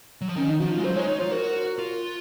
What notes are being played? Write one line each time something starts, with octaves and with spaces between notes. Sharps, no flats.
F#3
F3
D#3 C#4
D#4
F3 F#4
F4
G#3
F#3 C5
G#3 C#5
D#4 C#5
F4 C5
F#4 A#4
F4